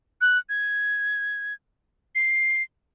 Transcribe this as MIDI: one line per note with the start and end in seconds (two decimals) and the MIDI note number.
0.21 0.38 90
0.49 1.53 92
2.15 2.63 96